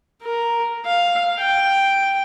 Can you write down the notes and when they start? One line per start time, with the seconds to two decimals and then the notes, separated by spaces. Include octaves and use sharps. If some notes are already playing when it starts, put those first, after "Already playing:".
0.22 A#4
0.86 F5
1.39 G5